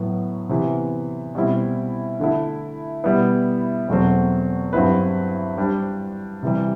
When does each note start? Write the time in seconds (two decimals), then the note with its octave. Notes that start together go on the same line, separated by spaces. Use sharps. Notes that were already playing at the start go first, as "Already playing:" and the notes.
Already playing: A2 F#3 B3
0.49 C3 E3 B3
1.35 B2 G3 C4 E4
2.20 D3 A3 E4
3.04 B2 G3 B3 E4
3.88 E2 B2 F#3 A3 C4
4.73 G2 F#3 C4 E4 B4
5.57 G3 D4 G4 C5
6.43 C3 E3 G3